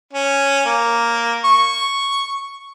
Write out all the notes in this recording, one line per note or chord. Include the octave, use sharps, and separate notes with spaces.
C#4
A#3
C#6